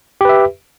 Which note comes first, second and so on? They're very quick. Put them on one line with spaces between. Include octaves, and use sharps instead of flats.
G4 B4 E5